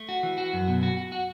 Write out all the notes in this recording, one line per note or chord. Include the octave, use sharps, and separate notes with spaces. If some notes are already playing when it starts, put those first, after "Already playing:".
Already playing: A3
F#4
E3
F#4
F#2
B2
F#4
F#4
F#4